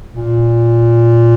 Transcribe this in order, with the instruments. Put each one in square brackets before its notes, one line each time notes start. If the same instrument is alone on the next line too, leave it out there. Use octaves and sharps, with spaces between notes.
[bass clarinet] A#2